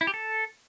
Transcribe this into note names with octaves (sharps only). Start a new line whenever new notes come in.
E4
G4
A4